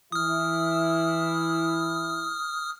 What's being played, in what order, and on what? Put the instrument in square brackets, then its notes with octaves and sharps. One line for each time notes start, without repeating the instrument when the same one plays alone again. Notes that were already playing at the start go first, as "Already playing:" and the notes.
[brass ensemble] E3 E4 [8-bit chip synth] D#6 F6